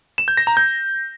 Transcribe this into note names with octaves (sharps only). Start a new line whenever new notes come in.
E7
G6
A#6
A#5
G6